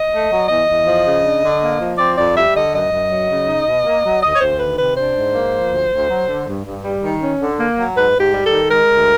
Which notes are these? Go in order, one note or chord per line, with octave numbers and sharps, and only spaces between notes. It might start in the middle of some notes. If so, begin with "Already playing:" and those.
Already playing: D#5
A3
F#3
E2 D#5
E2
F3
C#3
D4
D3
A#3
F3
C4 D5
F2 D5
G3 E5
D3 D#5
F#2 D#5
F#2
F#3
C#3
D#4
B2
A#3
F#3
D2 D#5
C#5
D2 C5
D#3 B4
C3 B4
D4 C5
G#2
A#3
F3
D2
D2
F#3
D3
G2
G2
G3
D#3
C#4
D3
A#3
F#3
G#2 B4
G#2
G4
G3
A4
D#3
G#3 A#4
D2